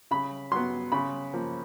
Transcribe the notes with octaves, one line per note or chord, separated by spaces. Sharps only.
C#3 B5
F#3 B3 C6
C#3 B5
F3 A#3